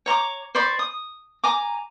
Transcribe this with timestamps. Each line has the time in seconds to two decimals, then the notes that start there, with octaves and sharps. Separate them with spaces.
0.06 C#5 A#5 C#6 D6
0.55 C5 D5 B5 C#6
0.79 D#6
1.44 G#5 A#5 D6